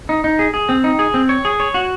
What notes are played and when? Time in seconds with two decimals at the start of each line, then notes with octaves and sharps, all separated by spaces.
0.09 D#4
0.24 D#4
0.39 G#4
0.54 G#4
0.69 C4
0.84 D#4
0.99 G#4
1.14 C4
1.29 C#5
1.45 G#4
1.60 C#5
1.74 F#4